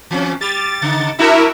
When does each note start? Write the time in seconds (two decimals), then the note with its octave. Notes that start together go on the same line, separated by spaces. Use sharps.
0.11 E3 C4 C#4
0.41 G3 G4 A6
0.82 C#3 D#4
1.18 G3 D4 E4 F#4 A#4 E5